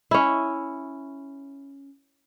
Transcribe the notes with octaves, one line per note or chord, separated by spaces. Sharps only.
C#4 E4